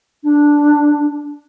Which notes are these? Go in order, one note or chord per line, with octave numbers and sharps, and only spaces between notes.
D4